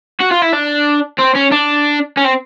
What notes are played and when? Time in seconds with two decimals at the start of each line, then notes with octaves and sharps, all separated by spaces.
0.21 F#4
0.31 F4
0.42 E4
0.53 D4
1.18 C4
1.35 C#4
1.52 D4
2.17 C#4
2.25 C4